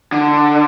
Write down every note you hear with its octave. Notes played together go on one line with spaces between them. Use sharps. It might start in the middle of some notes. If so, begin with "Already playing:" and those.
D3